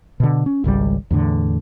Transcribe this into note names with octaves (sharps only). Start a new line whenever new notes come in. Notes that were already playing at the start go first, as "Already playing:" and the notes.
B2 D3
C#4
G#1 C#2 B2 G3
E2 A2 D3